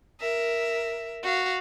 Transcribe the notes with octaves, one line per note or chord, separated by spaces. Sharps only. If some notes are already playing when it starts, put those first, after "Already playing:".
A#4 E5
F#4 F5